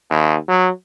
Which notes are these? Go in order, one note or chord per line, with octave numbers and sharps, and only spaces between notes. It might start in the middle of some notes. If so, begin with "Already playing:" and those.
D#2
F#3